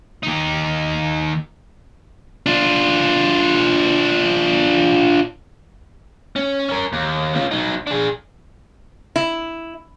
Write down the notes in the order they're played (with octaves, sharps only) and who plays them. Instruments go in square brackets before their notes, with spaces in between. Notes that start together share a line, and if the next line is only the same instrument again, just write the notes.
[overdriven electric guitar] D#2 D#4
[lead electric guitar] D4 F4
C#4
C#4 A#4
D#2
C#4 F4
F#3 D#4
D4 G#4
[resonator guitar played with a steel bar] E4